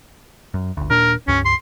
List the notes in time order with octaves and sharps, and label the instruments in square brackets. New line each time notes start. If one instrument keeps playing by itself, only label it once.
[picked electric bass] F#2
G1 D2
[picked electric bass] D#1 A#2 D4 [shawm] A#4
[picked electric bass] C#2 G2 [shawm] C#4
[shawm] C6